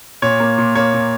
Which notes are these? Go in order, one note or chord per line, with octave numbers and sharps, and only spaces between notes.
A#2 C#5
A#3
A#2
A#3 C#5
A#2